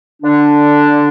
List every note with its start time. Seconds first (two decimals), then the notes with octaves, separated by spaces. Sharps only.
0.22 D3 D4